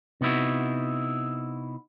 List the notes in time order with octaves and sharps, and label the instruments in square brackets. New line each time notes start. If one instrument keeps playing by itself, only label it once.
[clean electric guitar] C3 B3 D#4 E4 F#4